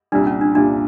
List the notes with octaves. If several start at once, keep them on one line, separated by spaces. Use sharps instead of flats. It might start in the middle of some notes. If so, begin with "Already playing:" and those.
C2 A#2 G3 D4
C#4
D4
C2 A#2 G3 D4